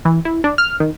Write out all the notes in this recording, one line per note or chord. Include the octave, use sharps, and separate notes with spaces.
E3
E4
D4
F6
D#3